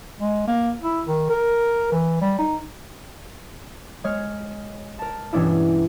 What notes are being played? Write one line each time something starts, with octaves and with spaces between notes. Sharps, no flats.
G#3
A#3
E4
D#3
A#4
E3
G3
D#4
G#3 C#5 F6
A#4 A5
G2 B2 E3 C#4 D4 E4